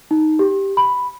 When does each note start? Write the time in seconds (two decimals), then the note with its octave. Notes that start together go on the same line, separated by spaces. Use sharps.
0.11 D#4
0.39 G4
0.77 B5